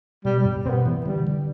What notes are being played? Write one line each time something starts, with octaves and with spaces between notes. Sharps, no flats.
B2 G3
G3
G2
B2 B3 C4
E3
D3 G3
D3